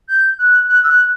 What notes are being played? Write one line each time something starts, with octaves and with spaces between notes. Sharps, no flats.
G6
F#6
F#6
E6
F#6